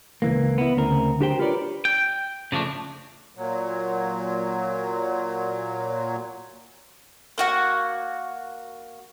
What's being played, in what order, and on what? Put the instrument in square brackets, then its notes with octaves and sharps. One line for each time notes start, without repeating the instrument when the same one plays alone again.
[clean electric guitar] C#2 E3 A#3
B3 E4
D2 C#3 C4 A#4
D4 F#4 G4 A#4 C5 G5
F4 G4 A#4 B4 C#5 D5
G5
C#3 F3 A3 D4
[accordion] A#2 F#3
[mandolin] A#3 F#4 F#5